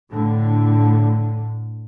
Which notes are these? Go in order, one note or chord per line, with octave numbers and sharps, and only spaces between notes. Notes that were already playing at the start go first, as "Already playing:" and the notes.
A2 D3